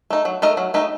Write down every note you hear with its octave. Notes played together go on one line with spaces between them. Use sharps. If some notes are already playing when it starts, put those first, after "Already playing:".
A3 D#4
F#3
A3 D#4 A#4 D#5
F#3
A3 D#4 A#4 D#5